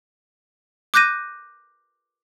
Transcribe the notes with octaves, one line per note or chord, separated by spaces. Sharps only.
D6 F#6 G6 A#6 D#7